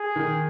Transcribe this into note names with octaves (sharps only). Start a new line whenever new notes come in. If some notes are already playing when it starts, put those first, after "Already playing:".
Already playing: G#4
D#3